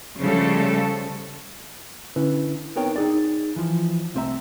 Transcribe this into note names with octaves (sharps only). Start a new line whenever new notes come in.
C#3 F3 G3 A3 A4
D3 C#4 E4 B4
B3 C4 D#4 A#4 C#5 G5
D#4 G#4 D5
E3 F3
C2 A3 C4 B4 E5 A#5